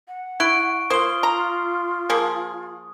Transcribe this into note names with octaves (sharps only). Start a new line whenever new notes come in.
F#5
E4 C#6 F#6 D7
A#3 F4 C5 D#6 G7
A#5
F3 A#3 G#4